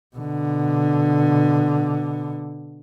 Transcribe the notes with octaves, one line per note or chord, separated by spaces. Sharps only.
B2 D3